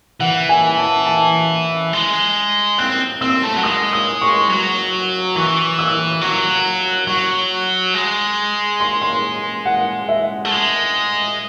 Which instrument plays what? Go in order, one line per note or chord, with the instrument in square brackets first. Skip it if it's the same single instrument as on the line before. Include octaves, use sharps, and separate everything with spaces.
[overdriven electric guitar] E3 [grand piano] F#5
[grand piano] G#5
A5
A5
[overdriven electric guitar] G#3
[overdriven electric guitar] C4 [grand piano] F#6
[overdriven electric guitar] C4 [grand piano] E6
[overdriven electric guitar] A3
F#3
[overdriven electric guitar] G#3 [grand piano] D#6
[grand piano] D#6
C#6
[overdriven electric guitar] F#3
[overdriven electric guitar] E3 [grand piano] C#6
[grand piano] E6
[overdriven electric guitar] F#3 [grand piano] C#6
[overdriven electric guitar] F#3 [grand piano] C#6
[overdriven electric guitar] G#3
[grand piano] C6
C6
F#5
E5
[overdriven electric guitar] A3
G#3